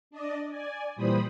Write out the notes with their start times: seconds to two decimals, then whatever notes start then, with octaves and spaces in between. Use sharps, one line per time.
0.11 D4 D5 D#5
0.49 D5 G#5
0.96 A#2 E3 G3 C5 B5 D#6